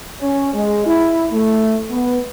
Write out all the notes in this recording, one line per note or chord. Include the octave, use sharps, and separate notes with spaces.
C#4
G#3
E4
A3
B3